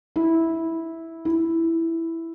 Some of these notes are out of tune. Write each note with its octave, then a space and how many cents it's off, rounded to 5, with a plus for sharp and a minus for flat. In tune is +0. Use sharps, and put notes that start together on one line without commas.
E4 -10
E4 +0